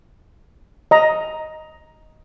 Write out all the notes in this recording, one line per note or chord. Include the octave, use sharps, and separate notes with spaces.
D#5 A#5